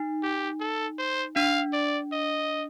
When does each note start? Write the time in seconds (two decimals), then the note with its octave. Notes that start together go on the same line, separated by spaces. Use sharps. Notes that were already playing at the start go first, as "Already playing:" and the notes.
Already playing: D#4
0.23 G4
0.60 A4
0.98 C5
1.35 D4 F5
1.73 D5
2.12 D#5